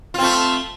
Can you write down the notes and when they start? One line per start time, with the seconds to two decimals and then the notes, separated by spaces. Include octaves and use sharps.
0.14 F4
0.18 C4
0.23 A3